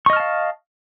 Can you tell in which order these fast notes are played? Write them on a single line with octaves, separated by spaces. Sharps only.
C#6 D#5 F6 A5 F5